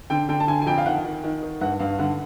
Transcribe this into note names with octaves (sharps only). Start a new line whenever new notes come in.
D3 G5
D3 G5
A5
D3 G#5
G#5
F2 G5
F5
D#3 F#5
D#3
D#3
D#3
G2 F#5
G2 F5
D3 F#5